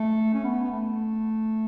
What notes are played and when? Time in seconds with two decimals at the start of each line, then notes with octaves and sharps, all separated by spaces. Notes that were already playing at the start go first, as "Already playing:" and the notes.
Already playing: A3
0.33 C#4
0.44 B3
0.63 B3
0.72 A3